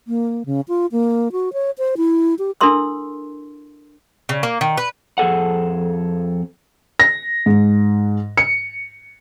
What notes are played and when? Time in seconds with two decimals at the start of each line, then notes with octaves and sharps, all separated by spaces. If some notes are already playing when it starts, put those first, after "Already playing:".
0.08 A#3
0.46 C#3
0.68 F4
0.92 A#3
1.32 F#4
1.53 C#5
1.78 C5
1.97 E4
2.39 G4
2.61 D4 E4 A4 A#4 C6 E6
4.29 C#3
4.43 A#3
4.61 D#3
4.77 B4
5.18 F2 G#4 A4 F#5
7.00 A#6
7.46 G#2
8.37 C#7